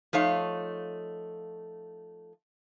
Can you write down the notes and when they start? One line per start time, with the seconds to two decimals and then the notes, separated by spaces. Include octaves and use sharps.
0.13 F3 A3 D#4 C#5 F5